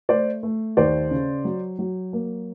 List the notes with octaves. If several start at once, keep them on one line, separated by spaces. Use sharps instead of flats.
A3 C5 D5
A3
D#2 C5 D5
C#3
F#3
F#3
A#3